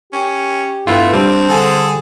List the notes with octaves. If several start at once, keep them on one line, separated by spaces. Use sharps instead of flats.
C#4 G4
G2 A3 B3 E4 F4
G3 C4 D4
D3 G#4 A4